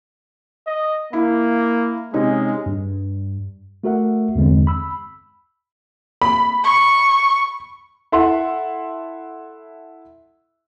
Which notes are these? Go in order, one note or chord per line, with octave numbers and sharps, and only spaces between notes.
D#5
A#3 E4
C3 G#3 C#4 D#4
G2
A3 F#4 A#4 E5 F#5
E2 G2 D3 G#3 C4
B5 E6
B5
C#6
E4 A4 E5 F#5 C6